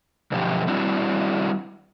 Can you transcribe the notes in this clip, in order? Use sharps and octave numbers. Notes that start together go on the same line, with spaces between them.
F#2 B2 D3 F3 G4
G3 C4 D4 E4 F#4